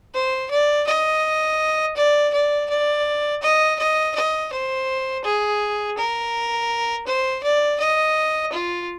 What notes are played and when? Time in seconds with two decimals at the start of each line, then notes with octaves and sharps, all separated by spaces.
0.14 C5
0.51 D5
0.87 D#5
1.96 D5
2.34 D5
2.69 D5
3.42 D#5
3.79 D#5
4.15 D#5
4.52 C5
5.24 G#4
5.97 A#4
7.07 C5
7.43 D5
7.80 D#5
8.52 F4